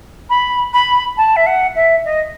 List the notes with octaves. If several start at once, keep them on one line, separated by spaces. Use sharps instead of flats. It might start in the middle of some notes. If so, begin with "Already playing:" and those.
B5
B5
A5
E5
F#5
E5
D#5